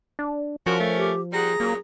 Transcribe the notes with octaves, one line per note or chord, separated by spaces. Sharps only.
D4
F3 C#4 F#4 A#4
A3
G4
A#2 G3 G#4 F#5 A#5
F#2 A#2 F#3 A#3